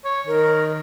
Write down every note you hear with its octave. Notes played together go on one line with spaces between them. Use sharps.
C#5
D#3 A#4